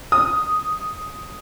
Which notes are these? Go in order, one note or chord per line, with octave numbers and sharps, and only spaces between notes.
D#6